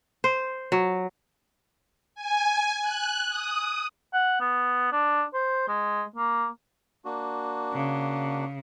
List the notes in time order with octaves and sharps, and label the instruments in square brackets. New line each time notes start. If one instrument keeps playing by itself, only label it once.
[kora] C5
F#3
[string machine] G#5
F#6
D#6
[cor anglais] F#5
B3
D4
C5
G#3
A#3
[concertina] A#3 D4 F#4
[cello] C#3